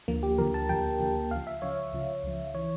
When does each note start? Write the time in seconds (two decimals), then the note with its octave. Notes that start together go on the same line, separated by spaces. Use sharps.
0.08 D2 D3 F3 A#3
0.23 G4
0.38 D2 D3 F3 A#4
0.54 A5
0.69 D2 D3 F3 G5
1.00 D2 D3 F3
1.31 C#2 C#3 F3 F5
1.47 E5
1.62 C#2 C#3 F3 C#5
1.93 C#2 C#3 F3
2.23 C#2 C#3 F3
2.54 E3 C#5